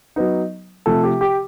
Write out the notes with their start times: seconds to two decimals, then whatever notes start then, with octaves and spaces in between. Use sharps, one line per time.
0.16 F#3 B3 D#4
0.86 C3 F3 A3 A4
1.04 G4
1.21 G4